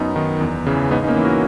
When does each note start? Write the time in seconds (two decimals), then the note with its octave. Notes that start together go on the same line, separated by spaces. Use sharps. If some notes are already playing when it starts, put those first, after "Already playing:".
Already playing: F#2 B3 D#4
0.16 D#3
0.41 E2
0.66 C#3 E3
0.91 G#2 B3 D#4
1.04 D#4
1.07 A#3 C#4
1.16 E3
1.25 F#4 A#4